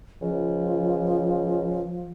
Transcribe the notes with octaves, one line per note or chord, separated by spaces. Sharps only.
C#2 F3